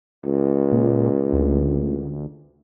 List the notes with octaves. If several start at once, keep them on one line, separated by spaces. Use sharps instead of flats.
C#2
A#2
D2